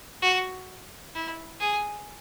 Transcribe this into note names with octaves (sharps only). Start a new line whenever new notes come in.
F#4
E4
G#4